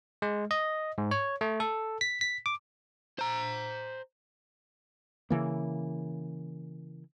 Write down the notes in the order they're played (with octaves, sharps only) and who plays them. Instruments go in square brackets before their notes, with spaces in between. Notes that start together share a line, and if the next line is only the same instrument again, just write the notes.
[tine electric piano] G#3
D#5
G#2
C#5
A3
A4
B6
B6
D6
[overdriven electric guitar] C5 A#5
[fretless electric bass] C#3 E3 A#3